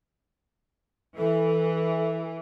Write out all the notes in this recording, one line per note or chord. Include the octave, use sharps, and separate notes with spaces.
E3 A4